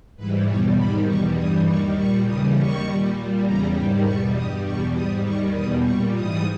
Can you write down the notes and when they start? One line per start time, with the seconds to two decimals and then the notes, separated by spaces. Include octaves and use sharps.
0.16 G#2 E3 G3 B4
0.46 E2 B2 G3 C#5
0.76 G#2 D#3 G3 B5
1.06 E2 B2 G3 C#6
1.36 G2 E3 G3 D#6
1.66 D#2 D#3 G3 C#6
1.96 A#2 G3 C#6
2.25 D#2 C#3 E3 G3 D#6
2.55 D#2 D#3 G3 C#6
2.85 A#2 G3
3.15 A#2 G3
3.44 E2 C#3 G3 A#5
3.75 G#2 D#3 G3 G5
4.04 E2 B2 G3 C#6
4.34 G2 G3 D#6
4.64 E2 B2 G3 C#6
4.94 G#2 G3 D#6
5.24 D#2 D#3 G3 C#6
5.53 E2 B2 G3 D#6
5.83 A#2 G3 C#6
6.14 G#2 E3 G3 D#6